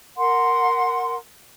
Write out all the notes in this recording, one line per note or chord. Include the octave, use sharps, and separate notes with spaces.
A#4 F#5 C6